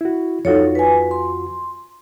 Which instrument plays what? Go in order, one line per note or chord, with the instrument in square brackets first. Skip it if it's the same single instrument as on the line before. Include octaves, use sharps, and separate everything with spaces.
[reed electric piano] E4 F#4
[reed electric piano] F2 F4 F#4 [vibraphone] D#4 A4 C#5
[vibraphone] B4 G#5
C6